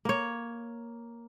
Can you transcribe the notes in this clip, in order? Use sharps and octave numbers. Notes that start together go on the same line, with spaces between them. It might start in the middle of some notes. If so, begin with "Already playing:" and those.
A#3 C#5